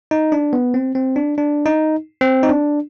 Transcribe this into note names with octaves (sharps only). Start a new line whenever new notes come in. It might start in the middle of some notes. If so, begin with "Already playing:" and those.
D#4
D4
B3
C4
C4
D4
D4
D#4
C4
D#4
D4